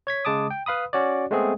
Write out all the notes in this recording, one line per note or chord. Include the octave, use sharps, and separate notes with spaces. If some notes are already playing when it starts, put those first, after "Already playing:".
C#5 G#6 B6
C#3 G#3 A5 D6 D#6
G5
B4 F5 B5 D#6
C#4 F#4 C#5 D5
G#3 A3 B3 C4 G#4